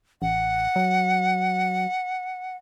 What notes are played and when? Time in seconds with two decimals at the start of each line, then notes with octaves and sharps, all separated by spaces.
0.22 A1 F#5
0.76 F#3